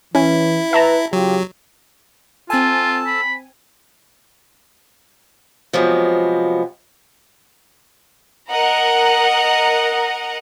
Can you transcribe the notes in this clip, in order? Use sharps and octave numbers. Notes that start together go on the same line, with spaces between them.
E3 C#4 E4
B4 E5 A5 A#5
C#3 F#3 F4 G4
C4 F4 A4 G#5 A5
B5
C3 F3 F#3 G#3 B3
A#4 D#5 F#5 A#5